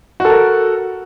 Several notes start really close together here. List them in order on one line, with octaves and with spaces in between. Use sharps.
F#4 A4 A#4